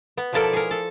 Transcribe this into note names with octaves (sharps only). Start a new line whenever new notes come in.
B3
B2 F3 E4 A4 A#4 D5
G#4 A#4
A4